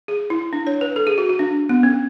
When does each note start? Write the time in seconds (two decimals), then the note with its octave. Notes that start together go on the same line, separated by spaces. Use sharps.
0.08 G#4
0.30 E4
0.53 D4
0.67 C#5
0.81 B4
0.96 A4
1.07 G#4
1.18 F#4
1.29 F#4
1.39 D4
1.69 B3
1.83 C#4